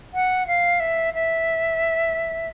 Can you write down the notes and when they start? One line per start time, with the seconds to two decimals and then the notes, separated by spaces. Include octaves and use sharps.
0.14 F#5
0.47 F5
0.80 E5
1.14 E5